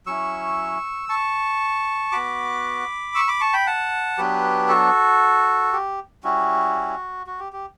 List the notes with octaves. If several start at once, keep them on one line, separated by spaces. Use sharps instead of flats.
F#3 C#4 E4 C#6 E6
A5 C#6
B3 F#4 B5 D6
C#6 E6
B5 D6
A5 C#6
G5 B5
F#5 A5
F#3 B3 D4 G4 B4
F#4 A4
G4
G3 C#4 E4 F#4
F#4
G4
G4